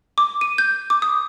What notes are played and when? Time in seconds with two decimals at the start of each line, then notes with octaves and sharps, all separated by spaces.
0.18 D6
0.41 D#7
0.58 G6
0.90 D6
1.02 D#6